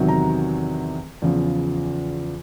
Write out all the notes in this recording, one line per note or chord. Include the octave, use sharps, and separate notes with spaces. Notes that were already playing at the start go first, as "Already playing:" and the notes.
Already playing: E2 C3 D#3 F#3
A#5
E2 C#3 F3